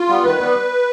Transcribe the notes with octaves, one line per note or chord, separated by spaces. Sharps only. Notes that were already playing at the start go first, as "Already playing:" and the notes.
Already playing: F4
G3 B3
D#3 B4
G3 B3